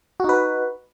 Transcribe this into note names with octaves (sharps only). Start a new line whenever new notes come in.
D#4 F#4 B4